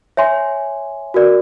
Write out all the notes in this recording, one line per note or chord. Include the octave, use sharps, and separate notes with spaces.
C#5 E5 G#5 C6
F#4 A#4 D5